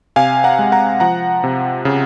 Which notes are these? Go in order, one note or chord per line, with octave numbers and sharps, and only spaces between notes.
C3 F5 G#5
F#5 A#5
G#3
F#5 A#5
F3 F#5 A#5
C3
C#3